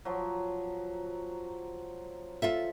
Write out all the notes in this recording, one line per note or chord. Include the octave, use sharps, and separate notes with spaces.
F3 F#3
F4 A4 E5